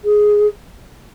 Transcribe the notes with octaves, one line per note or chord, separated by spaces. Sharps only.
G#4